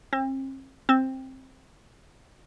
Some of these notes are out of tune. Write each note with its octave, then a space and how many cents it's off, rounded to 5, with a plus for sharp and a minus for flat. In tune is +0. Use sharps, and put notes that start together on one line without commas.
C4 +40
C4 +10